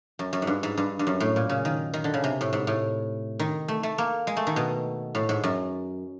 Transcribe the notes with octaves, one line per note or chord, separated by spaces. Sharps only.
F#2
F#2
G#2
G2
G#2
G2
G2
F#2
A2
A#2
C#3
D#3
D#3
D3
C#3
C3
A2
G#2
A2
D#3
A3
A3
A#3
G#3
A3
D#3
B2
A2
G#2
F#2